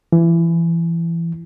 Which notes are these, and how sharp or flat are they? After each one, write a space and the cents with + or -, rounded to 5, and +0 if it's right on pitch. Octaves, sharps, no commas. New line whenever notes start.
E3 +25